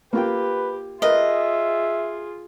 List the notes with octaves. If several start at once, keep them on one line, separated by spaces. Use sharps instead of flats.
A#3 F4 G4 B4 G5
F4 G#4 A#4 B4 D#5 E5